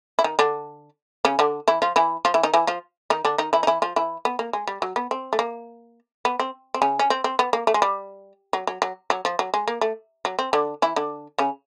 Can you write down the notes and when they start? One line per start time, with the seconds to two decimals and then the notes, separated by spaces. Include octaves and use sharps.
0.19 E4
0.24 D#3 D#4
0.39 D3 D4
1.25 C#3 C#4
1.39 D3 D4
1.68 E3 E4
1.82 F3 F4
1.96 E3 E4
2.25 F3 F4
2.34 E3 E4
2.43 D#3 D#4
2.54 E3 E4
2.67 F3 F4
3.10 D#3 D#4
3.25 D3 D4
3.38 D#3 D#4
3.53 E3 E4
3.63 D#4
3.67 E3 E4
3.82 F3 F4
3.96 E3 E4
4.25 B3
4.39 A#3
4.53 G#3
4.67 G3
4.82 F#3
4.96 B3
5.11 C4
5.33 A3
5.39 A#3
6.25 B3
6.39 C4
6.74 C4
6.82 C#3 C#4
6.99 C#4
7.10 C4
7.24 C4
7.39 B3
7.53 A#3
7.67 A3
7.74 G#3
7.82 G3
8.53 F#3
8.67 F#3
8.82 F#3
9.10 F#3
9.25 F3
9.39 F#3
9.54 G#3
9.68 A#3
9.81 A3
10.25 F#3
10.39 C4
10.53 D3 D4
10.82 E3 E4
10.96 D3 D4
11.38 C#3 C#4